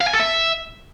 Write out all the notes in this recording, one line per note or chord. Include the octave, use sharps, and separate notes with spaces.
F5
G#5
A4
E5